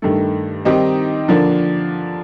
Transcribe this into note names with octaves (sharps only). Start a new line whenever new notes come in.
G2 D#3 A3
D#3 G3 C4 D#4 G4
D3 F3 A#3 D4